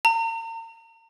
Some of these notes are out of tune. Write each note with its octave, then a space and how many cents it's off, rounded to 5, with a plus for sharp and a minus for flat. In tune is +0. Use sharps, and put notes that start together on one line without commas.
A#5 -40